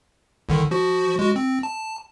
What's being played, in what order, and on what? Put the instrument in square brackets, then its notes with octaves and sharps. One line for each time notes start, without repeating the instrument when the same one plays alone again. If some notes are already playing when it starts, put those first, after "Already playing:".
[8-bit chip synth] C2 D3 D#3
F3 F#4
G#3 F#4
C4
A5